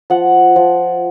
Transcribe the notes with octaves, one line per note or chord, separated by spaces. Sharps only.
F3 F#5
F3